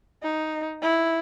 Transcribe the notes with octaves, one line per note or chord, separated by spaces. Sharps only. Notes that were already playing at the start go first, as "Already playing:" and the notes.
D#4
E4